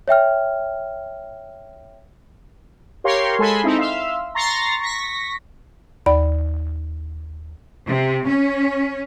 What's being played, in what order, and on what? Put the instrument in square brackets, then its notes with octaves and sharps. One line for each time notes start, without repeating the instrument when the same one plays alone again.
[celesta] C#5 E5 G5 F6
[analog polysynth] G4 A#4 C#5 F5 C6
G#3 A4 G#5 B5 C6
C4 D#4 E4
E5 F5 C6 E6
A#5 C6 C#6 A6 A#6 C7
C#6 A#6 B6
[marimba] D#2 D5 B5
[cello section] C3
C#4